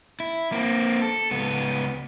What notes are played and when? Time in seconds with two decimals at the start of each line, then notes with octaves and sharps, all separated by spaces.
0.20 E4
0.52 A#3 C4
1.02 A4
1.31 C#2 B3